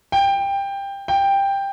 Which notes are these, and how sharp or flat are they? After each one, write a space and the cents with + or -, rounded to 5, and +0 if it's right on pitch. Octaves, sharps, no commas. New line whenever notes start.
G5 +15
G5 +10